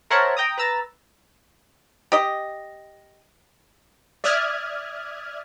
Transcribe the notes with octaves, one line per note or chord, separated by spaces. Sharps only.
A#4 C5 C#5 E5 F#5 A5
G5 A#5 D#6
B4 A#5 E6 A6
G4 D#5
D5 E5 D#6 F6 F#6 G#6